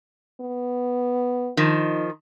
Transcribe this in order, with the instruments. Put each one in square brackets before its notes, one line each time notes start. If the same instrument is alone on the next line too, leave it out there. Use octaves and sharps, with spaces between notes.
[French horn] B3
[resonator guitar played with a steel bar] D#3 F3 [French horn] D#4